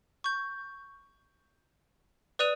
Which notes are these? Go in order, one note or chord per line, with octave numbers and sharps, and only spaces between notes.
C#6 G6
B4 D5 D#6 F#6 D#7 F7